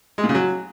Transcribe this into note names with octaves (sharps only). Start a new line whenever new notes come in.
G#3
A#2
C#3
F#3